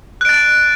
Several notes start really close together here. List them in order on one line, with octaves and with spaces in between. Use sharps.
F#6 D7 A6